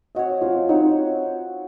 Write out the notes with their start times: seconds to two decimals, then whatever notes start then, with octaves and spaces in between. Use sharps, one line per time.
0.15 C4 F#4 C#5 D#5
0.41 F3 F4
0.69 C4 D#4 F#4 C#5